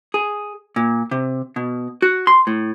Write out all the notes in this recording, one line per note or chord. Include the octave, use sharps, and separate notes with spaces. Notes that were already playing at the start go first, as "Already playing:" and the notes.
G#4
A#2
C3
B2
F#4
C6
A2